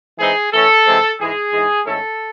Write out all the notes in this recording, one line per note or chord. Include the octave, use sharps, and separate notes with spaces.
E3 G#3 C4 D#4 G#4
E3 A3 C#4 A4
C3 E3 G#3 C4
G#2 E3 G#3 G#4
G#2 E3 G#3
G#2 D#3 A3 C#4 E4 A4